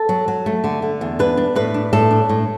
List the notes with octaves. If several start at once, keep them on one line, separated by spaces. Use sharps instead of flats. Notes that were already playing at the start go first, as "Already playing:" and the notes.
Already playing: A4
F#3
F#3
A3
D3
D3
E2
D4 B4
D4
A2 B4
D4
A2 A4
D4
A2